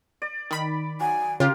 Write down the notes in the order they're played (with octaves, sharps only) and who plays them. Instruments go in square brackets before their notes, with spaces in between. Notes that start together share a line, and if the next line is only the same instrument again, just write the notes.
[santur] D5
[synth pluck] D#3 B5
[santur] F#3 [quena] G#5
[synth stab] C#3 [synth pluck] F4 G4 [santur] A#4